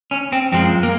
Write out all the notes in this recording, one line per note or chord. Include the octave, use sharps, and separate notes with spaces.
C#4
C4
F#2 F3 G#3 C4
A#3